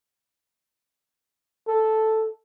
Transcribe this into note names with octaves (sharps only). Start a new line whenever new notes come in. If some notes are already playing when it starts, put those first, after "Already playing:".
A4